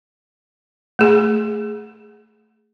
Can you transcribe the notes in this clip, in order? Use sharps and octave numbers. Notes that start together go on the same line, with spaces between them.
A3 G#4